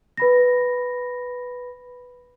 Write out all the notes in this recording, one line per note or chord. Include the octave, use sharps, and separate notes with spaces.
B4 B5 A#6